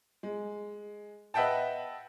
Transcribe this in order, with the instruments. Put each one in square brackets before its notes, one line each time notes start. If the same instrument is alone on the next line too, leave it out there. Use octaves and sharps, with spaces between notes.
[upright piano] G#3
B4 D#5 E5 F#5 G5 A5